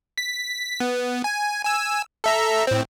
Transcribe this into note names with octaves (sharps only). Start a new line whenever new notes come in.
B6
B3
G#5
G#5 E6
A4 E5 A#5
A2 C4